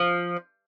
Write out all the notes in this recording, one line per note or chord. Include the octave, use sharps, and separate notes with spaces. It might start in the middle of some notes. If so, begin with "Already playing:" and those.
Already playing: F3